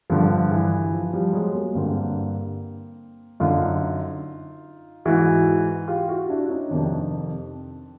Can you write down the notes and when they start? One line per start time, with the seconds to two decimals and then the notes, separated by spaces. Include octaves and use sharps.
0.10 G2 D3 F3
0.51 E3
0.92 F3
1.13 F3 G3
1.33 F#3 G#3
1.54 G#3 A#3
1.75 G2 D3 A#3 C4
3.40 F#2 D3 D#4 F4
5.05 G#2 E3 E4 F#4
5.88 F4 G4
6.08 E4 F#4
6.30 D4 E4
6.50 C#4 D#4
6.71 F2 C3 D#3 C4 D4